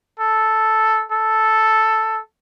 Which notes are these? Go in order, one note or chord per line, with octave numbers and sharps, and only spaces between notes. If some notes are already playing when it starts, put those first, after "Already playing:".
A4
A4